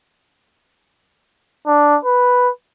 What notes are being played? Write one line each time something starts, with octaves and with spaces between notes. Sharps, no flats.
D4
B4